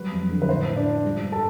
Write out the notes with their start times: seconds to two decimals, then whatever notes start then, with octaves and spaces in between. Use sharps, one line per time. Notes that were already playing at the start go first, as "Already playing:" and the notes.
Already playing: F#3 G3 B4
0.12 F2
0.31 D3
0.42 B4
0.48 A2 C5
0.67 A2
0.76 D4 D5
0.86 F3
1.05 G3
1.24 G2
1.32 A4 A5